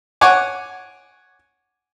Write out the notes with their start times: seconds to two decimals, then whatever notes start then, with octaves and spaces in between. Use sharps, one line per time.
0.21 C#5 F#5 G#5 D6